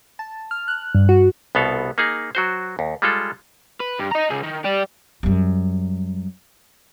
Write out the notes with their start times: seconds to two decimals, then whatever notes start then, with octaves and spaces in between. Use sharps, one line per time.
0.19 A5
0.51 F6
0.68 F#6
0.95 G2
1.09 F#4
1.55 C2 B2 B3 A4 F5
1.98 A#3 D#4 G#4
2.35 F#3 F#4 C5
2.79 D#2
3.02 G3 G#3 F4 A4
3.80 B4
4.00 G2
4.12 D#5 A#5
4.31 C#3 G#3
4.44 D#3
4.65 G4 D5
5.23 F#2 G3